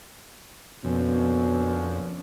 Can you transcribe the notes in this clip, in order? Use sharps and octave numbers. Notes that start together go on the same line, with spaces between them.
F2 B2 D3 A#3 C#4